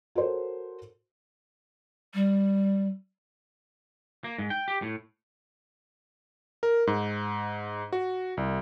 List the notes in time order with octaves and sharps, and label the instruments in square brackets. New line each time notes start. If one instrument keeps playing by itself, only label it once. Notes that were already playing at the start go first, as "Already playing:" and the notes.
[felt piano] F#4 A4 A#4 C5 C#5
[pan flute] G3
[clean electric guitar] A#3
G#2
G5
G4
A2
[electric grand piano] A#4
G#2
F#4
C2